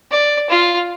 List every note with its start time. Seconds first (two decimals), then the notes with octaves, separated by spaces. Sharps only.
0.11 D5
0.49 F4